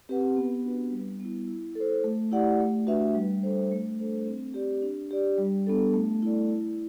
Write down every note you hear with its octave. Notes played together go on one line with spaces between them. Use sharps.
C4 G4 B4 F#5
B3
D4 F#4 B4
G3
B3 E4
E4
A4 C5
A3
E4 G4 D5 F#5
A3
D4 F#4 B4 E5
G3
D4 A4 C5
A3
D4 A4 C5
C4
G4 D5
D4
G4 D5
G3
B3 D4 A4
A3
E4 A4 D5
E4